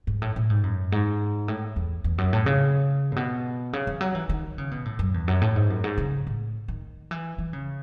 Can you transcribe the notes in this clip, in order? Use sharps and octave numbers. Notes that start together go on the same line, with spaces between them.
G#2
A2
A2
G#2
F#2
G#2
A2
E2
E2
F#2
A2
C#3
A2
B2
C#3
E3
F#3
E3
D#3
C#3
B2
A2
F#2
E2
F#2
A2
G#2
F#2
G#2
C#3
A2
D#3
E3
E3
C#3